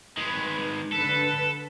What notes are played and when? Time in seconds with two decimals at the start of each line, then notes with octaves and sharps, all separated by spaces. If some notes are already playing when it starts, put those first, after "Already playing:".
0.17 D#3 G#3 B4
0.92 D3 A4 B4